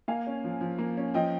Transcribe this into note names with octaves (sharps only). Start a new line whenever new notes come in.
A#3 F5 G#5
C#4
F3
F3
A#3
C#4
F3 D#5 G5